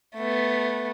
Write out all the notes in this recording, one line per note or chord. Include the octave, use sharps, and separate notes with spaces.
A3 B3